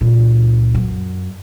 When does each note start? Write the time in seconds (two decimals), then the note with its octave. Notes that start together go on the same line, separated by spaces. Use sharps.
0.01 C#2 A#2
0.75 F#2